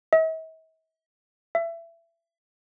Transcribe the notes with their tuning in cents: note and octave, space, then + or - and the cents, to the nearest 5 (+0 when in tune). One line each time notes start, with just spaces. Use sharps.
E5 -45
E5 +25